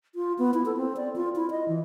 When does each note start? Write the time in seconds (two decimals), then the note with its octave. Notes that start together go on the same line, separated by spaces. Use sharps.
0.15 F4
0.39 B3
0.54 E4
0.66 A4
0.77 C4
0.97 D5
1.16 F4
1.36 E4
1.51 D#5
1.68 E3